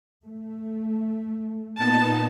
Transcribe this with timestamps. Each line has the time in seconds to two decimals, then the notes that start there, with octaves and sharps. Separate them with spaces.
0.25 A3
1.78 A#2 B3 D#4 A5